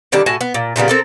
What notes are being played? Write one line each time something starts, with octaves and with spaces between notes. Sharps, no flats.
D3 D#3 G3 D4
A2 F#4 G#5 A5
B3
A#2
A#2 C#3 G3 B3
C4 A4 A#4